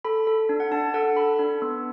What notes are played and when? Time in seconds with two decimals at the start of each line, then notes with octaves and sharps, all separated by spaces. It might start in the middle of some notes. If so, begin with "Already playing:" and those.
0.05 A4 B5
0.27 A4
0.49 D4
0.60 F#5
0.72 D4 A5
0.94 A4 F#5
1.17 A4 B5
1.39 D4
1.62 B3